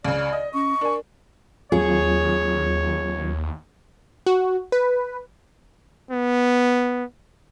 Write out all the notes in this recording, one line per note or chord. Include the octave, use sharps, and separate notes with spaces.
C#2 C#3 D5
D#5
C#4 C#6
D4 A#4 G#5
D#2 F#3 C4 F4 G#4 C#5
F#4
B4
B3